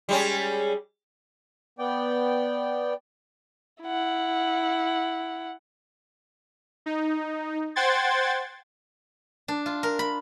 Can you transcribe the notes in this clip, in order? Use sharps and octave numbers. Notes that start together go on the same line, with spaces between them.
G3 G#3 C#4
B3 D5 G5
E4 F#5
D#4
C5 F#5 G5 C6 G#6 A6
D4
F4
A#4
B5